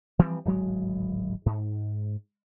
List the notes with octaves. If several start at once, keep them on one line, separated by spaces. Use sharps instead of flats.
E3 F3 G3 C4
D1 G#1 F#3 G#3
G#2